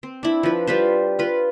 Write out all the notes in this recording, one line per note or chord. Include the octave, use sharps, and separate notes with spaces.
C4
D4 E4
F3 B4
G3 F4 B4 C5
F4 B4